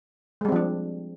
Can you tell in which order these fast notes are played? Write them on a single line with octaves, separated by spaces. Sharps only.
G#3 G3 C4 F3 D4